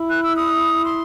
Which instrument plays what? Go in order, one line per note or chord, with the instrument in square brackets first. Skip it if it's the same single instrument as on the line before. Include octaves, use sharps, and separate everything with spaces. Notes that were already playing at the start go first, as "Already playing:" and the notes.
Already playing: [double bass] E4
[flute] F#6
E6
D#6
C6